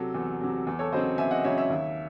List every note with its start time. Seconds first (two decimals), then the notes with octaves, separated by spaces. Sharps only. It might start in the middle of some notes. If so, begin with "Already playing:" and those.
Already playing: C3 F#3 A4
0.14 E2
0.41 C3 F#3
0.67 E2
0.79 A4 C#5
0.92 C#3 F#3 C4 C5 D#5
1.18 E2 E5 G#5
1.31 D#5 F#5
1.44 C#3 F#3 C4 C#5 E5
1.57 C#5 E5
1.70 D#2